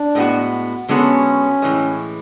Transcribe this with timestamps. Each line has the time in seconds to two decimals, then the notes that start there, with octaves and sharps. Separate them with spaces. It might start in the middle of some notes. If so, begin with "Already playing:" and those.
Already playing: D4
0.15 A2 G#3 B3 F#4
0.89 D3 G#3 B3 C#4 F#4 A4
1.62 A2 E3 G#3